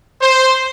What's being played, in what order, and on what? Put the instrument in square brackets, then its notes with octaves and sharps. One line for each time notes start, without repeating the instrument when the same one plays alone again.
[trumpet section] C5